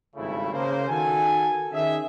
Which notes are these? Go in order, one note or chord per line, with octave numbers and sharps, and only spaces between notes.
G#1 G2 C#3 A3 E4
C#3 A#3 C5
D#3 F#4 A4 G#5
D#3 C#4 G#4 E5